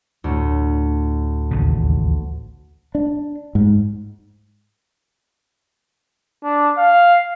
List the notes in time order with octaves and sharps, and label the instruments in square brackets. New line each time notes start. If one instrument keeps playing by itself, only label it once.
[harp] D2 A2
[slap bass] A1 D#2 C#3
[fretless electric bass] D4
G#2
[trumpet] D4
F5